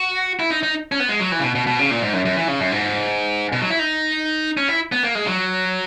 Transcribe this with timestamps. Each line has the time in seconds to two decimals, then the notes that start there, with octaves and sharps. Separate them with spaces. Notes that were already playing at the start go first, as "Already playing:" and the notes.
Already playing: F#4
0.40 E4
0.50 D#4
0.63 D#4
0.92 C#4
1.00 B3
1.09 G#3
1.20 F#3
1.32 E3
1.39 C#3
1.43 B2
1.55 B2
1.67 B2
1.79 C#3
1.91 A#2
2.01 G#2
2.13 F#2
2.25 F#2
2.36 E3
2.48 C#3
2.60 F#2
2.72 G#2
3.52 B2
3.61 F#3
3.70 E4
3.79 D#4
4.57 C#4
4.68 E4
4.92 B3
5.03 A#3
5.15 G#3
5.27 F#3